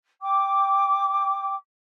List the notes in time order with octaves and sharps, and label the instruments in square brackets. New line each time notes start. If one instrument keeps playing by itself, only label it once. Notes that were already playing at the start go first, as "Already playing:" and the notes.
[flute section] G5 D6